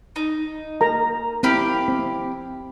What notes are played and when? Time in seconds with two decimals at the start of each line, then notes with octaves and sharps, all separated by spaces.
0.16 D#4
0.81 A#4 A#5
1.43 C4 E4 G4 F5
1.88 C4